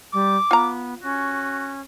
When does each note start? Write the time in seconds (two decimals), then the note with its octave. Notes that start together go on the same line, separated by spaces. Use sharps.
0.13 G3 D6
0.51 B3 F4 A#5
1.02 C#4 F#4